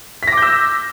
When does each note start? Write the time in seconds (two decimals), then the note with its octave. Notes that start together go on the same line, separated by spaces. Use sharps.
0.23 B6
0.28 A#6
0.32 D6
0.37 G6
0.42 E6